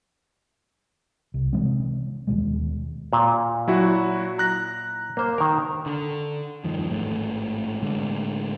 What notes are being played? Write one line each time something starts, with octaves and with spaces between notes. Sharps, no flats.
C2
C3 E3 G#3 C4
D#2 B2 G#3
A#2
F#3 E4 F#4
A#5 F#6 A#6
A#3 C5
D#3 A#4
D3
E1 G2 D#3 F3
A1 G#2 A3
A2 D3 G#3